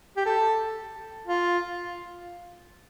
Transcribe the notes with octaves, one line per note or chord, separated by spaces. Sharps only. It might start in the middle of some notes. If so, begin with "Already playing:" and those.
G4
A4
F4